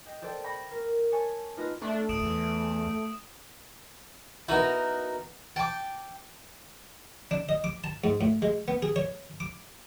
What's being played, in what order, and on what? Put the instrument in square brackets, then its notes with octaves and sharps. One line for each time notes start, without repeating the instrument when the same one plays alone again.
[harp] D#5 G5
G4 A4 C5 D5 G5 A5
G5 B5 C#6 A#6
A#4
C#5 G#5 A5 C#6
B3 D#4 F4 B4 D#5
[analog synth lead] A3 [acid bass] D4
[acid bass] D#1 [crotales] D#6 D7 E7
[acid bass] E2
[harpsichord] B3 E4 [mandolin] D#4 F#4 A#4
[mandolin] G5 D6 [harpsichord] A5
[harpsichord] D4
D#5
D6
A5
G#2
A2
G#3
B3
G#4
C#5
D6